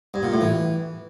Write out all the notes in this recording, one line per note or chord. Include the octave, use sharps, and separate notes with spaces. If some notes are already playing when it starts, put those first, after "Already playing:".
G2
A#2
A2
E3